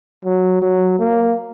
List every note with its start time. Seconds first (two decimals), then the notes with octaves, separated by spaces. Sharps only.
0.25 F#3
0.62 F#3
0.99 A#3